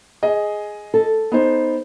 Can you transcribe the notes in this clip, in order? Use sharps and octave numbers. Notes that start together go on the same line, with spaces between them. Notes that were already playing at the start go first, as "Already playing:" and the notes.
G#4 D#5
A4
B3 D#4 C5